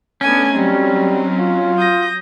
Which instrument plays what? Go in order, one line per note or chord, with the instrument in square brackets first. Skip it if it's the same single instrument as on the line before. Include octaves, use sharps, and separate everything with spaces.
[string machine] A3 [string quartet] B3 D4 G#5 [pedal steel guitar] C#4
[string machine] F#3 [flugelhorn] G3 [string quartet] C4 D#4
[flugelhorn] F4
[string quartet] D#6 G6 A#6